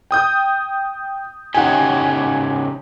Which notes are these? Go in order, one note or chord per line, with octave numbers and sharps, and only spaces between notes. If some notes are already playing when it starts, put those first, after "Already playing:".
G5 D#6 G6
C#3 D#4 G4 F#5 G#5